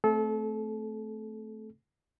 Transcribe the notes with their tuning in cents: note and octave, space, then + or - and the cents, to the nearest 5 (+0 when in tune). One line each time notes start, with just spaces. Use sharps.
A3 +0 C4 +0 A4 -30